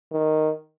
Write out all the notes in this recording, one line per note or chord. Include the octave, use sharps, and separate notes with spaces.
D#3